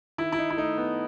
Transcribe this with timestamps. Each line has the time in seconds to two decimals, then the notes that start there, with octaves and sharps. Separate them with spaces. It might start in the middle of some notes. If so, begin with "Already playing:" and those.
0.18 D#3 E4
0.32 E4
0.39 D#4
0.50 E4
0.57 A3 D#4
0.78 B3